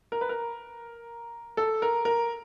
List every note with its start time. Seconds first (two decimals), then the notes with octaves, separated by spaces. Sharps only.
0.12 A#4
0.21 B4
0.29 A#4
1.57 A4
1.82 A#4
2.05 A#4